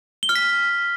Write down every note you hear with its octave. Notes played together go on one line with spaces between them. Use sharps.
G7
F6
B6